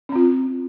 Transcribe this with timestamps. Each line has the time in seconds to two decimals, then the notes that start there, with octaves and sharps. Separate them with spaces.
0.09 C#4
0.12 C4
0.15 F4